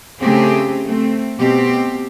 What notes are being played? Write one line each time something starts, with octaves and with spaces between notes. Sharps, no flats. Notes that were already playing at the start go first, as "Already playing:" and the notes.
C#3 A3 C4 G4 G#4
A3 C4
B2 C4 G4